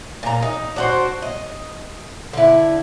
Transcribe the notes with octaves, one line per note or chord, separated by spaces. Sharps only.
A#2 A#5
D#4
D4 F#4 C5
D#5
D3 E4